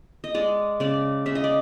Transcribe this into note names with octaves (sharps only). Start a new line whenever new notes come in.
D#5
G#3 D5
C#3 D5
C#3 E5
D#5
D5